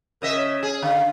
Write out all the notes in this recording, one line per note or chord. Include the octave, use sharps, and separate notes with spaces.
C#3 A#4 D#5 E5
C#5
G#4
D3 F5